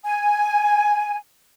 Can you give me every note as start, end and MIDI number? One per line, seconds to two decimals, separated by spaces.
0.04 1.16 80